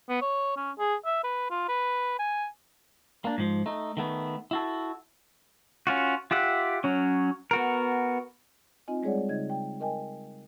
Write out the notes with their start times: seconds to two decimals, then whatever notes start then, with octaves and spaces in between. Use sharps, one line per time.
0.09 B3
0.22 C#5
0.57 C#4
0.79 G#4
1.05 E5
1.24 B4
1.51 F4
1.69 B4
2.19 G#5
3.25 A#3 D4
3.38 G#2 F3
3.66 A3 D#4
3.97 D#3 A3 B3
4.51 E4 F#4 A4
5.87 C#4 F4 F#4
6.31 F4 G4 E5 F#5
6.84 F#3 C#4
7.51 B3 F#4 A#4
8.88 C4 D#4 F4 D#5 G#5
9.03 G3 G#3 G#4 C#5 D5 F#5
9.29 C#3 D#4 D#5 G#6
9.50 G5
9.80 A#4 D#5 G5 G#5